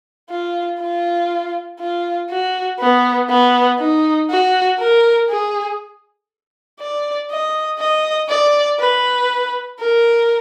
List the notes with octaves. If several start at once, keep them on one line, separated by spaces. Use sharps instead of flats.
F4
F4
F4
F#4
B3
B3
D#4
F#4
A#4
G#4
D5
D#5
D#5
D5
B4
A#4